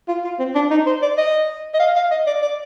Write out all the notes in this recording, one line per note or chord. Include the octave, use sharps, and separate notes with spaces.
F4
F4
C4
D4
D#4
C5
D5
D#5
D#5
F5
F5
D#5
D5
D5